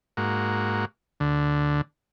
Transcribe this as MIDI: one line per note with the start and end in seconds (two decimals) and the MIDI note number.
0.17 0.85 44
0.17 0.85 58
0.17 0.85 66
1.20 1.81 38
1.20 1.81 50